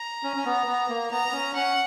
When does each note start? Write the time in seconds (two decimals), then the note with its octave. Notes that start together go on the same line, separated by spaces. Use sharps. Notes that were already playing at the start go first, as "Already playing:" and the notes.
Already playing: A#5
0.23 C#4
0.36 C#4
0.45 B3
0.67 B3
0.89 A#3
1.11 B3 A#5
1.29 B3
1.33 C#4
1.55 C#4 F#5